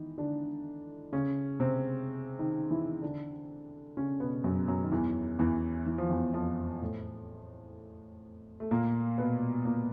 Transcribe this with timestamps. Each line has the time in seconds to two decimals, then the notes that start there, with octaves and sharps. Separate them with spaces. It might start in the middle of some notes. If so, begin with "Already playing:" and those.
Already playing: D#3 E3 D#4 E4
0.18 D3 D4
1.13 C#3 C#4
1.60 C3 C4
2.39 D#3 D#4
2.71 E3 E4
3.02 D3 D4
3.97 C#3 C#4
4.20 B2 B3
4.44 F#2 F#3
4.68 F#2 F#3
4.83 D#3
4.92 E2 E3
5.39 E2 E3
5.86 E3
5.98 F3
6.10 E2 E3
6.34 F2 F3
6.81 A2 A3
8.60 A3
8.71 A#2 A#3
9.18 B2 B3
9.65 A#2 A#3